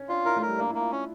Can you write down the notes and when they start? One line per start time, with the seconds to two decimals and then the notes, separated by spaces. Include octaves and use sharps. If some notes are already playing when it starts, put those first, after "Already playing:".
Already playing: C#4
0.09 D4 F4
0.25 E4 A#4
0.36 A3
0.42 A#4
0.48 G3
0.58 A#3 D4
0.70 E4
0.75 A#3
0.80 F4
0.92 C#4 F4